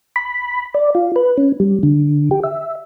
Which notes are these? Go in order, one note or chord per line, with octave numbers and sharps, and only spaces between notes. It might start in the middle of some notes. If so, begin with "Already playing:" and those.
B5
D5
F4
B4
C#4
G3
D3
G4
E5